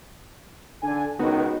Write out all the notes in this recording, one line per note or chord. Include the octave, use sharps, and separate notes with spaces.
D3 D4 G#5
C#2 D#3 B3 D#4 F#4